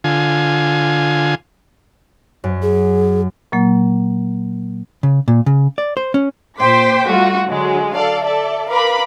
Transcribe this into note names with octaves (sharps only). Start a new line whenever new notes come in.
D3 F4 G#5
F#2
G#4
A#2 F#3 A#3
C#3
A#2
C#3
D5
C5
C#4
A#2 C5 G5 C6 D6 B6
G3 A3 F4 F#4
D3 F#3 G#3
A4 D5 F5
A4 D5 E5
A#4 B4 F5 B5 D6